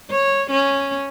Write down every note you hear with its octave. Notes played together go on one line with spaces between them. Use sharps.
C#5
C#4